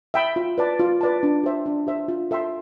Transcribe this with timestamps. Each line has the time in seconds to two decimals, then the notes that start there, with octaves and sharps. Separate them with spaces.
0.14 E5 G5 B5
0.36 F4
0.58 B4 D5 A5
0.79 F4
1.01 B4 D5 A5
1.23 D4
1.44 G4 C5 E5
1.66 D4
1.87 G4 C5 E5
2.08 F4
2.31 A4 E5 G5 C6